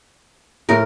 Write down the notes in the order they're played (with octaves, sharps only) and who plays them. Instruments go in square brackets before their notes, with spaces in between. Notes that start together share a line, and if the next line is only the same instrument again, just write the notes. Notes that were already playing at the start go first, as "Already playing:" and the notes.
[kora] A2 [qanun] A#4